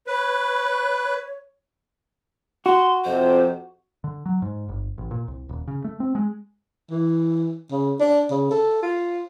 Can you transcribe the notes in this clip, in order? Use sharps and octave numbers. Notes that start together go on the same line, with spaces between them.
B4 C#5
F#4 C6
F2 C3 C5
D3
F#3
G#2
G1
A1
A#2
C2
D#1
C#3
A3
C4
G#3
E3
C#3
D4
C#3
A4
F4